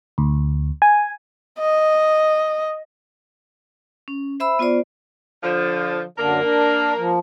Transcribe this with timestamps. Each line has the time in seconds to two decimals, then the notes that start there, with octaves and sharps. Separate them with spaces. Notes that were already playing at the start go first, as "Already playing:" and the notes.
0.18 D2
0.82 G#5
1.59 D#5
4.08 C#4
4.40 C5 E5 B5 E6
4.59 B3 F4 C5 D5
5.43 D3 F3
6.18 F#2 D3 A#3 D4 A#4
6.42 D4
6.97 F3